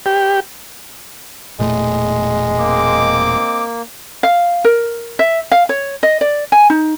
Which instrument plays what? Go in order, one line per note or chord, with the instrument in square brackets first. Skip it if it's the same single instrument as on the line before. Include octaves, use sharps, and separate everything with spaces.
[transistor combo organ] G4
[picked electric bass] E1 A#2 A3 [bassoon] G#3
[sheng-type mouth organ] A#3 [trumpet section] C4 D#5 D6
[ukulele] F5
A#4
E5
F5
C#5
D#5
D5
G#5
D#4